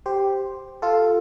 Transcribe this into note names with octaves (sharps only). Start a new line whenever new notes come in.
G4 C5
F4 A4